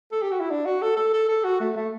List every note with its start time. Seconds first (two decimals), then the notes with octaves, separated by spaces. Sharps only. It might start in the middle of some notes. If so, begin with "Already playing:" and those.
0.12 A4
0.22 G4
0.31 F#4
0.40 E4
0.50 D4
0.66 F#4
0.82 A4
0.97 A4
1.14 A4
1.29 A4
1.44 F#4
1.60 A3
1.76 A3